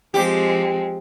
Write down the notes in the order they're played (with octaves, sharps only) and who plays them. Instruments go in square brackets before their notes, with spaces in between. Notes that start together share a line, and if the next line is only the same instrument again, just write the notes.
[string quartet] F3 G#3 C4 [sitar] G4